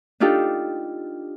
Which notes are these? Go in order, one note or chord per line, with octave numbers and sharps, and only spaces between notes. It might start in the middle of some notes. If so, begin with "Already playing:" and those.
D4 D#4 F4 G4 A4